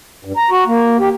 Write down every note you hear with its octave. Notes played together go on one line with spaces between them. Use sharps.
G2
A#5
F#4
A#3
G4